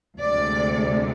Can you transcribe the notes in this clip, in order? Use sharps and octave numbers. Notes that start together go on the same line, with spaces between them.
D2 C3 G#3 D5